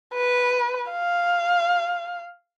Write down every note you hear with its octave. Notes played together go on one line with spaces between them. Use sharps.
B4
F5